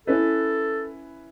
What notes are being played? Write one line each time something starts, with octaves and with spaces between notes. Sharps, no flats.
C#4 E4 A4 B4